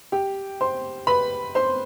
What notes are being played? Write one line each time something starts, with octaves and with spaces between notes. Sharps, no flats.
G4 G5
C5 C6
B4 B5
C5 C6